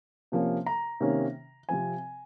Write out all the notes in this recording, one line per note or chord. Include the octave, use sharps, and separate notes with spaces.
C3 F3 A#3 C#4
A#5
C3 D#3 A#3 C#4
C3 F3 C4 G#5